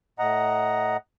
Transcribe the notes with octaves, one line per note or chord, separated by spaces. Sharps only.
A2 D#5 F#5 A#5